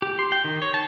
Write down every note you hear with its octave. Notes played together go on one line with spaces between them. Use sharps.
G4
C6
G5
D#3
C#5
A5